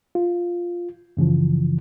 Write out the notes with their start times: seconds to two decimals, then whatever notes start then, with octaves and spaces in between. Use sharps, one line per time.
0.15 F4
1.17 F#2 C#3 E3 F3